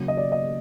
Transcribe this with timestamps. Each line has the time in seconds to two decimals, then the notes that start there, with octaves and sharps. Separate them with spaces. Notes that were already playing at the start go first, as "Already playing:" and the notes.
Already playing: C#3 F#3 A#3
0.08 D#5
0.17 D5
0.32 D#5